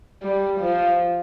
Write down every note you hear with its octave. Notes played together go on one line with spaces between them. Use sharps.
G3
F3